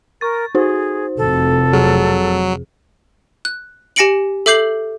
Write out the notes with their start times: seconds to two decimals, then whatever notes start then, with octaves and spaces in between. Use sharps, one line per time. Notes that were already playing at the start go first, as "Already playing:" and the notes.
0.21 A#4 C#6 A6
0.55 D#4 F#4 G#4 C5
1.17 F1 F2 A4
1.73 F#3 G#4
3.45 F#6
3.96 G4 G#5 A#6 C#7 D7 F#7
4.46 A4 E5 D6 G6 C7 F#7